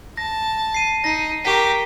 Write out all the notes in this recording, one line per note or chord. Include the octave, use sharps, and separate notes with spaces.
A5 A#6
C7 D#7
D#4 A#6 C7
G4 A#4 C#6 B6